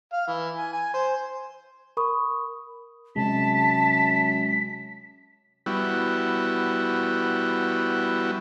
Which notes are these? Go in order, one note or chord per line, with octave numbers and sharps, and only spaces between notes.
F5
E3
G#5
G#5
C5
A#4 B5 C#6 D#6
F#2 C3 G#3 A5 B6
G3 B3 E4 F#4